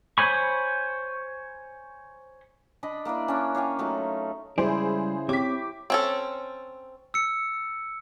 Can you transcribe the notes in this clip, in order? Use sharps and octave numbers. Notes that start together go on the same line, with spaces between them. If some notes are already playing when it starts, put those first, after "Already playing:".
C5 C#5 G#5 B5 C#6
D4 D#5 B5
A#3 D4 E4 D5
C#4 D4
C#5 F5 G5 G#5
F#3 A3 D#4 F4
C#3 G3 G#3 E4 G#4 C5 D5
C4 G4 C#5 D6 B6
C4 C#4 A4
E6 C#7